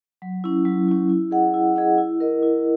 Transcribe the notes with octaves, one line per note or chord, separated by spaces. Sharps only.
F#3
C#4 E4
F#3
C#4 E4
E4
G#4 D#5 F#5
E4
G#4 D#5 F#5
E4
A#4 D#5
E4